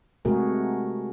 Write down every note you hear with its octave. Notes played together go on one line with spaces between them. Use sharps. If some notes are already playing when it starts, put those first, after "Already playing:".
C3 G#3 A3 F#4 G#4 A#4